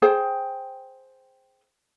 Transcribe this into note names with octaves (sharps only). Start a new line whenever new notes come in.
G#4 C5 G5